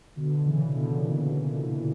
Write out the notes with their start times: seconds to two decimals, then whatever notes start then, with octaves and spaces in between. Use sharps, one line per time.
0.16 B2 D3
0.46 C#3 E3
0.75 B2 D3
0.97 A#2 C#3